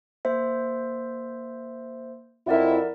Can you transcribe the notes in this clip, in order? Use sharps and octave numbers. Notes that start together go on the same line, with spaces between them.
A#3 C5 E5
F2 C4 E4 A#4 D5 F#5